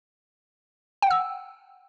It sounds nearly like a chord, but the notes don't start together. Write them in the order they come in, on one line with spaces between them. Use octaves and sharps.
G5 F#5 E6